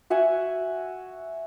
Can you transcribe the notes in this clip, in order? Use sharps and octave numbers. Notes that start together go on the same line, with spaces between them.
F#4 E5 F#5 G#5